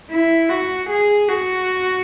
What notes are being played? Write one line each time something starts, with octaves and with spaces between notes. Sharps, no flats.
E4
F#4
G#4
F#4